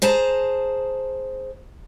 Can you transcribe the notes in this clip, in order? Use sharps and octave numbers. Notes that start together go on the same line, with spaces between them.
G#4 C5 A5 A#5